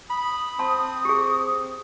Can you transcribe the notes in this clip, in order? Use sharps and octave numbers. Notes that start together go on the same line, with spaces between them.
B5 D#6
C4 A5 C6
G4 G#4